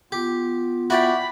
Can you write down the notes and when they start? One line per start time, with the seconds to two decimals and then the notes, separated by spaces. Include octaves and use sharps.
0.12 B3 F4 G4
0.90 E4 F#4 D5 G5 B5